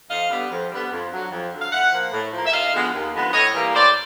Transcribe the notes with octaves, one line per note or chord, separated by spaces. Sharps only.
F2 D#5 F5
D3 G3 B3
F2
D3 G3 B3
F2
D3 F#3
F2
D3 F#3
F5
A2 E5 F#5
F3 A#3
A2
F3 A#3
E5
D#2 D#5 F5
D3 F3 G#3 B3
D#2
D3 F3 G#3 B3
A2 C#5 D#5
E3 G3 A#3
A2 C5 D5